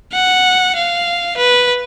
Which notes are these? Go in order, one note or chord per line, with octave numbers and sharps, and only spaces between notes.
F#5
F5
B4